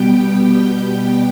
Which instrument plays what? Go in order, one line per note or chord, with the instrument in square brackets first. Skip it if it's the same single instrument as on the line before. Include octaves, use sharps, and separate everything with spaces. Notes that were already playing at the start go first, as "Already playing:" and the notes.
Already playing: [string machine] B2 G3 B3 G4 G5